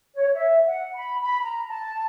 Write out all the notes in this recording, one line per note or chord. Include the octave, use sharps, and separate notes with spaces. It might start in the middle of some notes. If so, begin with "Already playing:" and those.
C#5
E5
F#5
B5
B5
A#5
A5